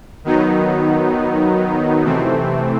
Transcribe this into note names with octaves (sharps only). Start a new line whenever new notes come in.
D#3 F#3 B3 D#4
C3 E3 A3 C4